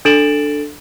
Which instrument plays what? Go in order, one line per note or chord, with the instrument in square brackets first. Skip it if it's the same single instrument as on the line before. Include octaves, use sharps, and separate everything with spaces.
[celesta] D4 A4 A6 D7 E7 F#7